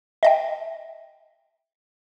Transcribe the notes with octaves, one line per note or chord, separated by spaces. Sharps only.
D#5 E5 G5